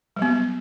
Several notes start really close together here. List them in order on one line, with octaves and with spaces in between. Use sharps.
G3 F#3 B3